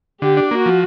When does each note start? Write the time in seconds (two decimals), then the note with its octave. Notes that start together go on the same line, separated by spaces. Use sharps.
0.22 D3 G4
0.37 D4
0.51 A#3 F#4
0.66 F3